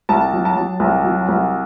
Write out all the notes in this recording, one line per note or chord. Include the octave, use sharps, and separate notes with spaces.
C2 A5
F#3
A5
F#3
C2
F#3
C2